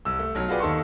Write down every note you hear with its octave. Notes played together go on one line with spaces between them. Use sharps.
C2 E6
A3
B1 F#3 F6
F4 F#4 G#4 B4 D5 G5
D#2 D#4 A4 A5 C6 C#6